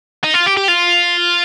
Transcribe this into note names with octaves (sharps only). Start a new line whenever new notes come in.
D#4
F4
G4
G4
F4